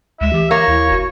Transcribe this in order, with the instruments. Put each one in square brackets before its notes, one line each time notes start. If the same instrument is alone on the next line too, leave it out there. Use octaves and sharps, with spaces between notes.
[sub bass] D2 [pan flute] G#3 [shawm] E5
[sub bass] E3 [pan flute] G4
[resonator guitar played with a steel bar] A#3 [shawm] C#5
[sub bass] D#2 [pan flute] E4
[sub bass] F1 [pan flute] F#4